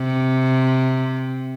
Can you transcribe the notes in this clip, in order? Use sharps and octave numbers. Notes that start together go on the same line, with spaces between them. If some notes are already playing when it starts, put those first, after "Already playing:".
Already playing: C3